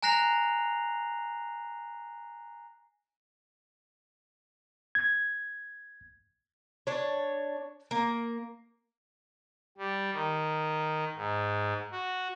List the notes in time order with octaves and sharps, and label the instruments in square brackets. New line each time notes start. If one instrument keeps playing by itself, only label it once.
[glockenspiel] G#5 A#5 F#6 A#6 C7 F7
[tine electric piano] G#6
[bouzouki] D4 C#5
A#3
[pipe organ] G3
D#3
G#2
F#4